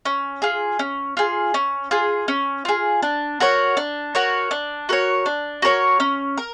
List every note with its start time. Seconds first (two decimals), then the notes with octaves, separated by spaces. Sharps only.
0.05 C#4
0.42 F4 G#4
0.79 C#4
1.17 F4 G#4
1.54 C#4
1.91 F4 G#4
2.28 C#4
2.65 F4 G#4
3.02 D4
3.40 F#4 A#4 C#5
3.77 D4
4.15 F#4 A#4 C#5
4.51 D4
4.89 F#4 A#4 C#5
5.26 D4
5.62 F#4 A#4 C#5
6.00 C#4
6.37 A#4